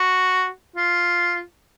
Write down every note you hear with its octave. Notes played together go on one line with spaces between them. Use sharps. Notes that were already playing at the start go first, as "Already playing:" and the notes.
Already playing: F#4
F4